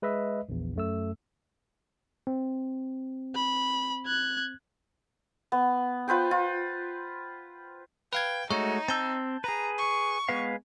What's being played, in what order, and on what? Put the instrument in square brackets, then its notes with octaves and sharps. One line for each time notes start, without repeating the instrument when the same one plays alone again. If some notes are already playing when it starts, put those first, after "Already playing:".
[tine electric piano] G#3 B4 D#5 E5
A#1 E2
F#2 A3 E6
C4
[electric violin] B5
F#6 G#6
[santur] B3
F4 B4 C5 G5
F4
[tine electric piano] B4 F5 G#6 [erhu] G5
[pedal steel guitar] G#3 A3 F#4 [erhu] D#4 [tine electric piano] C#5
[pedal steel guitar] C4 E6 [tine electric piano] A5 G6
[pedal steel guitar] G#4 B4 [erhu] A#5
[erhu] C#6
[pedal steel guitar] G#3 B4 F5 [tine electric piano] B3